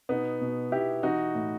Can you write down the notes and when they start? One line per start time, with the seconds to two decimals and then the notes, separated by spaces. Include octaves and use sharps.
0.09 B2 B3 D#4
0.41 B2
0.72 B2 E4 G4
1.03 E3 D#4 F#4
1.35 A2